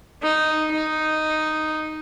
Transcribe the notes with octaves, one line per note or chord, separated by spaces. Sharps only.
D#4
D#4